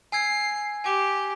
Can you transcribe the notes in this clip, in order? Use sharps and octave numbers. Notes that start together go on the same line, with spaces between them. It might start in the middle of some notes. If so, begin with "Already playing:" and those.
G#5 E6 G#6 C7
G4 G#5 D6